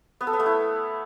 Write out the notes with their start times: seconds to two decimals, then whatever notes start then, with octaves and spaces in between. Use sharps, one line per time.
0.21 B3
0.27 A4
0.33 B3
0.40 A3
0.46 E4